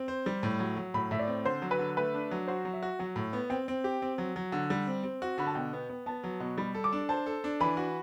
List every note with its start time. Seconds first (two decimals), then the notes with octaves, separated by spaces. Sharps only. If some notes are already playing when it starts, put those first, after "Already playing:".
Already playing: C4
0.08 C5
0.26 G3
0.43 A2
0.60 F#3
0.76 F#3
0.94 A2 B5
1.11 A2 E5
1.19 D5
1.28 C4
1.45 D3 C5
1.62 F#3
1.71 B4
1.79 D3
1.97 A3 B4
2.14 D4
2.31 F#3
2.48 F#4 C5
2.65 F#3
2.73 E5
2.83 F#4
2.99 F#3 F#5
3.16 A2
3.33 B3
3.50 C4 G5
3.68 C4
3.84 G4
4.02 C4
4.18 F#3
4.36 F#3
4.52 D3
4.70 G3
4.87 C4
5.04 C4
5.22 F#4
5.38 D3 B5
5.47 A5
5.55 B2 G5
5.73 B3
5.89 B3
6.06 B3 A5
6.24 F#3
6.40 B2
6.58 G3 B5
6.74 A4
6.84 D6
6.93 D4
7.09 C5 A5
7.26 A4
7.44 D4
7.60 E3 B5
7.77 F#4